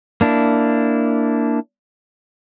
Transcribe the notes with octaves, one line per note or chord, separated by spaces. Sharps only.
A#3 D4 E4